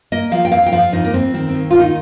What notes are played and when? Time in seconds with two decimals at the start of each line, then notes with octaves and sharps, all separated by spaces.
0.12 A#3 D#5
0.31 F3 F5
0.45 G5
0.52 F2 F5
0.66 G5
0.72 F3 F5
0.92 F2 D#4
1.04 A#3
1.13 F2 C4
1.34 D#3 C4
1.49 C4
1.54 D#2
1.71 F4
1.75 D#3 D#4